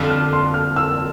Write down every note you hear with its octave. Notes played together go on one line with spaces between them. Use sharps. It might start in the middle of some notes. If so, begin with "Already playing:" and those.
Already playing: F2 D3 G3 D4 F4 F6
F6
C6
F6
E6